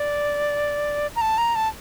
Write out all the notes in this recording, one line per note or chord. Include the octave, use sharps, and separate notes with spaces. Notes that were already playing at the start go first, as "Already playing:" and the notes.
Already playing: D5
A#5
A5
A#5
A5